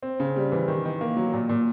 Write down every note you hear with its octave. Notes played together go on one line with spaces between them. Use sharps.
C4
C#3
G3
E3
D#3
D#3
A#3
F#3
A#2
A#2